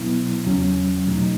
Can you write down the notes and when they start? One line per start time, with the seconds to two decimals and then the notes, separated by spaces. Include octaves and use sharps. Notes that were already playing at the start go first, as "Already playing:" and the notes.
Already playing: B2 F#3 B3 E4
0.45 E2 C#3 F#3 C#4
1.07 B2 F#3 A3 D#4